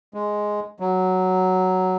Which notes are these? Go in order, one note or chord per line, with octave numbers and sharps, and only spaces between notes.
G#3
F#3